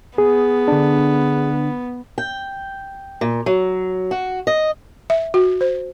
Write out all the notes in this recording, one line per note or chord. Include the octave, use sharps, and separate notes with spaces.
B3 G#4
D3 D4
G5
A#2
F#3
F#4
D#5
E5
F#4
C5